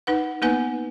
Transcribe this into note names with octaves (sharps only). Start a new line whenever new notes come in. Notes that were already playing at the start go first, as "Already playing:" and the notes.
D#4 B4 F#5
A#3 B3 D#4 B4 F#5 G#5